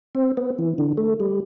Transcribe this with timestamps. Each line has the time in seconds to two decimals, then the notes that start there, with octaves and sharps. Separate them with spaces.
0.15 C4
0.37 B3
0.59 E3
0.78 D3
0.97 A3
1.20 G3